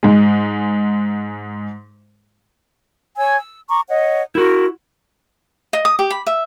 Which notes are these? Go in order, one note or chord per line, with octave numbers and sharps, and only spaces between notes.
G#2 G#3
C#5 G#5 E6
E6
A#5 C#6 D6
C#5 D#5 F#5
E4 F#4 A#4
D#5
D#6
G4
B5
E5